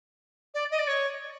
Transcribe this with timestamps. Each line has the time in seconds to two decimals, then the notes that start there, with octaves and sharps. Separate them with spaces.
0.54 D5
0.71 D#5
0.78 D5
0.87 C#5